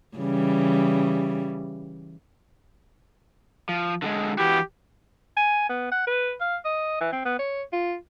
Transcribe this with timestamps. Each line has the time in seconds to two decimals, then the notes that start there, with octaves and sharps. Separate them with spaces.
0.17 C#3 E3 G3
3.69 F3
4.02 D3 G3 G#3
4.38 E3 E4 F#4 G4
5.37 G#5
5.69 B3
5.92 F#5
6.07 B4
6.41 F5
6.65 D#5
7.01 E3
7.13 C4
7.25 B3
7.39 C#5
7.73 F4